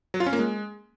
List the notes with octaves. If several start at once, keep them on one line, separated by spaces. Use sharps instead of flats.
F#3
F4
C#4
A#3
G#3